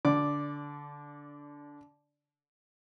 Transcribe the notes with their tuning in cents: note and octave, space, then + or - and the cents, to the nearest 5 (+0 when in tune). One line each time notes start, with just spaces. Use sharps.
D3 -15 D5 +0 D6 +0